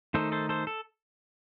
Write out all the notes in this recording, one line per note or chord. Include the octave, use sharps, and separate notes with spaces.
D#3 A3 D#4 A4 C5
A4 C5
A4 C5
A4